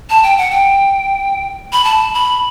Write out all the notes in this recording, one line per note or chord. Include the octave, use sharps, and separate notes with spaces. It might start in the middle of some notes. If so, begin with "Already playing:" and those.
A5
G5
F#5
G5
B5
A5
B5